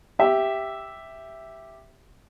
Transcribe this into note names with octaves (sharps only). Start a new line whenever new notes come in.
G4 E5